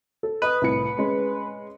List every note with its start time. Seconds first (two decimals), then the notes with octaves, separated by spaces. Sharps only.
0.23 A4
0.42 B4 D#5 D#6
0.62 C2 A2 C#7
0.98 G#3 C#4